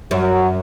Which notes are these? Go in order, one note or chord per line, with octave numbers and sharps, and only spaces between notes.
F#2 F#3